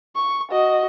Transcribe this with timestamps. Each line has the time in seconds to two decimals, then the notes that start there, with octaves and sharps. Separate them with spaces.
0.16 C#6
0.51 F#4 D#5